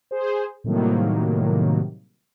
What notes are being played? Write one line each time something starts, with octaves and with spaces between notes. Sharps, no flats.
G#4 C5
A2 C3 D#3 F#3 G3 A#3